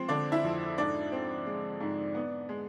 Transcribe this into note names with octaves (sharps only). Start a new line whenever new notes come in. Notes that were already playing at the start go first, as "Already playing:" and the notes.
Already playing: F3 G#3 C4 C5
D3 D4 D5
E4 E5
F2
G#2 D4 D5
C4
G#3
G#2
B3
G#3